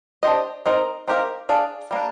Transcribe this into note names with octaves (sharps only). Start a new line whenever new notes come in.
D4 G4 C5 D#5
C4 D#4 A#4
C4 D#4 G4 A#4 F5
D4 G#4 D5 F5
G3 A#3 D4